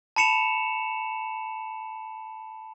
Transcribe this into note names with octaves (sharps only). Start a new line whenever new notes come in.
A5 B5 C#7 E7 F7